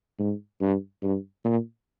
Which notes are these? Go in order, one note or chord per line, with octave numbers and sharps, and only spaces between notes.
G#2
G2
G2
A#2